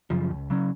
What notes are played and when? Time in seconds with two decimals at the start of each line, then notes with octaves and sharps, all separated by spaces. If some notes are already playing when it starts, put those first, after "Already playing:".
0.10 F#2 C#3 F3
0.31 C#2
0.50 C#3 F#3 C#4